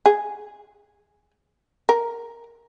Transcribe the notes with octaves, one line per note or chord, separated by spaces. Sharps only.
G#4
A#4